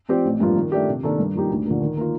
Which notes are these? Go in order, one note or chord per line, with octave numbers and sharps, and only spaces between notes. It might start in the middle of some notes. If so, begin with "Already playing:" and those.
F3 C4 G4 D5
A1
G2 F3 A#3 F4
D#3
A3 D4 G4
C3
D#3 A#3 D4 A4
G2
F3 A#3 D#4 G4
D2
D3 F3 A#3
D#3
A#3 F4